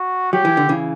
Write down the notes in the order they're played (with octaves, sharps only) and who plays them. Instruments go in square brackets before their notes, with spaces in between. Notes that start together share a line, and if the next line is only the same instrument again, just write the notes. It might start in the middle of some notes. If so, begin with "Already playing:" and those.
Already playing: [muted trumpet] F#4
[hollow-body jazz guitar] F#3 [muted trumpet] G4
[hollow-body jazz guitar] E3
D3
C#3 E3